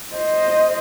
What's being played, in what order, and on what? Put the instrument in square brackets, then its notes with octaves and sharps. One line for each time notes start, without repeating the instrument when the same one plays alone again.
[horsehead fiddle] C5 D#5